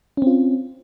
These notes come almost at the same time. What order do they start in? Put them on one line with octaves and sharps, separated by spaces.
C#4 C4 F4